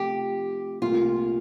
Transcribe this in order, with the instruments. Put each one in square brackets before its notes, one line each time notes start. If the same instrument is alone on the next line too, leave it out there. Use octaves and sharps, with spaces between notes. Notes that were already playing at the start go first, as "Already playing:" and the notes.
Already playing: [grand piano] C3 F3 A3 [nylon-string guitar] G4
[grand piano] C2 A#2 A3 [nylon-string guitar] F4